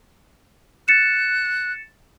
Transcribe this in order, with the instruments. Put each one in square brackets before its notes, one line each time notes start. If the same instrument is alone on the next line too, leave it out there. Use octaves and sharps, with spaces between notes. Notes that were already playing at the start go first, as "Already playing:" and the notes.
[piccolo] F#6 [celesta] A6 C#7 E7